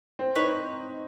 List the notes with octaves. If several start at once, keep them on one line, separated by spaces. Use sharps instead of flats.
C4
D#4 B4 C#5